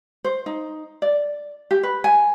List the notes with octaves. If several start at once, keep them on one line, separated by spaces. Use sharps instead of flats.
C5
D#4
D5
G4
B4
G#5